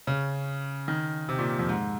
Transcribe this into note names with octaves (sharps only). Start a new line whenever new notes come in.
C#3
D#3
C3
A#2
F2
G#2